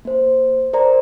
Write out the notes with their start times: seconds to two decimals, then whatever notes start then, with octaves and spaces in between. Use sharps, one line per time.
0.05 A#3 C5
0.73 A#4 C5 D5 A#5